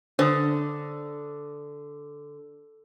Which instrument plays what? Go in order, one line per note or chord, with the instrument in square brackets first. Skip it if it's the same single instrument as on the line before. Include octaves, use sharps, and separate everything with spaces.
[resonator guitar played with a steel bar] D3 [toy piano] C5 D#6